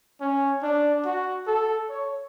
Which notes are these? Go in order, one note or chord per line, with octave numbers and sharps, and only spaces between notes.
C#4
D4
F#4
A4
C#5